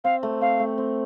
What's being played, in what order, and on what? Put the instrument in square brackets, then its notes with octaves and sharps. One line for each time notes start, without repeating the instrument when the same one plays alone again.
[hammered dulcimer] C4 [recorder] F5
[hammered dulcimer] A3
[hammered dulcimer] C4 [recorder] F5
[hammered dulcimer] A3
C4